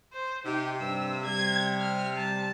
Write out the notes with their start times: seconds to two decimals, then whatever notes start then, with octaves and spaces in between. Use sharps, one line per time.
0.13 C5
0.45 C3 D#4 G4
0.80 G2 E6
1.25 G3 G#6
1.80 F6
2.17 G3 A5